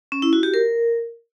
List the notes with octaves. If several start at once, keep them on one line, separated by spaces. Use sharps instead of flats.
C#4
E4
F#4
G4
A#4